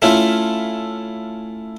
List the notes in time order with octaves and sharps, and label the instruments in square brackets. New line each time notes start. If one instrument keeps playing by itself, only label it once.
[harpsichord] A3 C#4 E4 F4